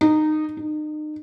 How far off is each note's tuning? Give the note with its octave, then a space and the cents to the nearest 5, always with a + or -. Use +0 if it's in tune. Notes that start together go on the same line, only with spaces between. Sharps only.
D#4 -15
D#4 -35